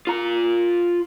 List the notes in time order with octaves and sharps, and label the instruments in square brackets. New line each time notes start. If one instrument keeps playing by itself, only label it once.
[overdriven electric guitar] F4 A#5